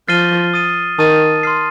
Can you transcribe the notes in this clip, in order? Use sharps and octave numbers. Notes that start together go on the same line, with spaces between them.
F3 F6 A6 C7 D#7 G7
D#6 A6 D#7
D#3 A5 D#6 A6 D#7
C6 F6 C7